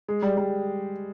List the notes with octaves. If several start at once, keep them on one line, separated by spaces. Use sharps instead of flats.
G#3
G3
G3